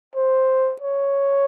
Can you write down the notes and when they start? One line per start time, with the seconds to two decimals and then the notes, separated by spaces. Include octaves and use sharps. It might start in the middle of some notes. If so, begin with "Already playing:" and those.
0.15 C5
0.81 C#5